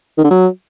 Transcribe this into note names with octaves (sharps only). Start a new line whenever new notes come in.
D#3
D3
F#3